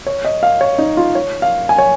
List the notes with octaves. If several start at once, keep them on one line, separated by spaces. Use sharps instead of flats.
C#5
D#5
F5
C#5
D#4
F4
C#5
F5
G#5
C#5